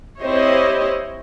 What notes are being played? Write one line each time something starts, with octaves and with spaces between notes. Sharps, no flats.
C4 E4 G4 C5 C#5 D#5